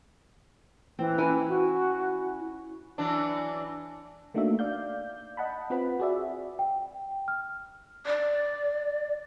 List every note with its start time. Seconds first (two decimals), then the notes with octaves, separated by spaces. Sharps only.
0.99 E3 C4
1.18 C#4 E4 G#5
1.49 F#4
2.98 E3 F#3 D4
4.34 A3 A#3 D4 D#4 F#4 E5
4.59 D5 F5 G6
5.37 D#5 F#5 A5 B5
5.70 C4 F4 B4 F#5 B5
6.00 F#4 G#4 D5 E5
6.59 G5
7.28 F6
8.06 D5